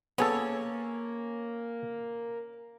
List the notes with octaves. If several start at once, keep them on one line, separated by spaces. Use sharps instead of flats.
A#3 B3 C#4 G#4 A4 C#5